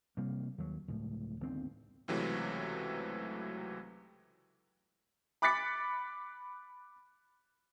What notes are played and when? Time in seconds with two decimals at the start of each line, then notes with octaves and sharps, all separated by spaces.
0.17 C3 G3 A#3
0.58 D#2 F#3
0.88 C#2 A2
1.40 G1 D#2 C4
2.08 C#2 C3 E3 F#3 A3 C4
5.42 B5 D6 F#6 A6 B6 C#7